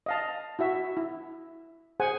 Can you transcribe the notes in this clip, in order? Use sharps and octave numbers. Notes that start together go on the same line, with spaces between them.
D#5 F5 A5
E4 F#4 E5
E4
G#4 C5 F#5 G#5